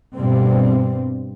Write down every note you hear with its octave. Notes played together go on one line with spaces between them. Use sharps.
G2 B2 G3 C4